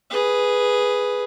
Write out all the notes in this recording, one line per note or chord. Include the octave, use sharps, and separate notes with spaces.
G#4 B4